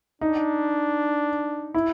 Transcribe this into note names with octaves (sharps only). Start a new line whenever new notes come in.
D4 D#4
E4